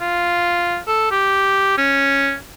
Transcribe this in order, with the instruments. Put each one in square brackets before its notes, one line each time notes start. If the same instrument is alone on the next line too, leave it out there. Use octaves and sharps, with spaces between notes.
[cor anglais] F4
A4
G4
C#4